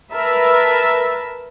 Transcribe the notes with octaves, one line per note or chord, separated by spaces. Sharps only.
A#4 B4 E5 A5